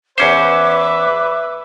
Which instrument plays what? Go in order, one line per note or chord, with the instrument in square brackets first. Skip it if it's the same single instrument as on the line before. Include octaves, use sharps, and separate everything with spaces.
[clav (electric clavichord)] E2 C#4 C5 [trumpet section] B4 E5 [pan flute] D6